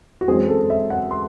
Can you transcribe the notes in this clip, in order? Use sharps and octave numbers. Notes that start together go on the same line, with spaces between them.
F#4
F#2 E3 G#3 C4 G#4
A4
E5
F#5
C6